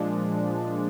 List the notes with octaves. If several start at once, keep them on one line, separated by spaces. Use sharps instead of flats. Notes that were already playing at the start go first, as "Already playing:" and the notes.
Already playing: A#2 F3 G#3 D4